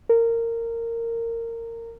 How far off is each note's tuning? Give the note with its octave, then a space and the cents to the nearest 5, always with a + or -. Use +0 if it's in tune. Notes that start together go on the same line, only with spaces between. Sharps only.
A#4 -20